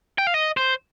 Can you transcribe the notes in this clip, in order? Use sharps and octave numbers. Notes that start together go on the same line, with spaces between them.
G5
F5
D#5
C5